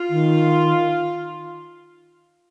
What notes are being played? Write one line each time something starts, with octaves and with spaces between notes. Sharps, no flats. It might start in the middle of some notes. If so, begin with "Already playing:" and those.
Already playing: F4
D#3